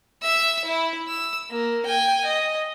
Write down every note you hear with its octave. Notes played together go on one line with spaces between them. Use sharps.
E5 E6
E4
E6
A#3
G5 G#5
D#5